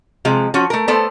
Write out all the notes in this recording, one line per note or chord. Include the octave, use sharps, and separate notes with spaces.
C3 F3 G#3
F3 C#4 F#4
A3 A#4
A3 B3 A4 C5 D5